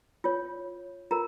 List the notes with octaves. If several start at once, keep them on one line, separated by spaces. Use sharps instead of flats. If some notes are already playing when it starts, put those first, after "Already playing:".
F4 C#5
F4 A#4 A#5